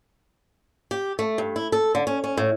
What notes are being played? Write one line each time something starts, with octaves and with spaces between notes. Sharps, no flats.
G4
A3
G2
E4
A4
D3
C#4
C#4
A2